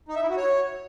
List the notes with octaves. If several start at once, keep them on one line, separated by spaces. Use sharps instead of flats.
D#4
E5
E4
F#4
C#5